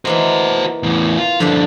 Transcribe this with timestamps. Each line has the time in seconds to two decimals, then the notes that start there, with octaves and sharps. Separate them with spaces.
0.05 E3 A#3 F#4 C5 D#5
0.83 E2 A2
1.18 F4
1.40 G2 D3 F3 G4 D5